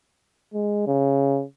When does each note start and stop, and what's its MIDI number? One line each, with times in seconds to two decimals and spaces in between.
0.54 0.86 56
0.87 1.43 49